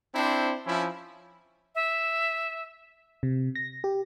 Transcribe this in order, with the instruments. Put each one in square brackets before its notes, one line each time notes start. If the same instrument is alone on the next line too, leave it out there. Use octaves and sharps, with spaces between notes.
[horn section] C4 D4 E4 C5
F3 C#4 E4
[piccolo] E5
[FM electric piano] C3
A#6
G4